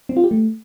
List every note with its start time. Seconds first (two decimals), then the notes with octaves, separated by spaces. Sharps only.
0.09 C4
0.17 F4
0.24 G4
0.31 A3